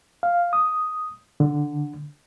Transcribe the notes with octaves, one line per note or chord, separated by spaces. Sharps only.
F5
D#6
D3